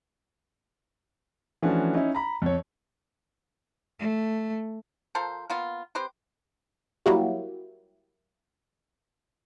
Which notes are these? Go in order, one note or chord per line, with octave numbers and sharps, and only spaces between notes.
E3 F3 A3 C#4 D4 F#4
C#4 D#4 E4
A#5 B5
F2 C#5
A3
F3 A4 A#4 C5
A#3 B3 F4
C4 G4 B4 C5
F#3 G3 A#3 E4 F#4 G4